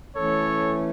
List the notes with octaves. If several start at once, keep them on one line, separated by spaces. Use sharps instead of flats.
E3 A3 C#4 A4 C#5